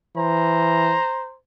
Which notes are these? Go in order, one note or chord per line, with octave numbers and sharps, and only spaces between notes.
E3 C5 A#5